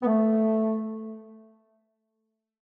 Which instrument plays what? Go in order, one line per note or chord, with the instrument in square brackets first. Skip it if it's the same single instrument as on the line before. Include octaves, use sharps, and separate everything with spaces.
[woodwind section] B3
A3